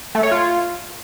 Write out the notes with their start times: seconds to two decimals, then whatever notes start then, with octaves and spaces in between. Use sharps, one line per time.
0.15 A3
0.23 C#5
0.31 F4